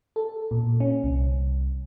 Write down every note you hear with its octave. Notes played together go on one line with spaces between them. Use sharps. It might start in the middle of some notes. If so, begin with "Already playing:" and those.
A4
A#2
C#4
C2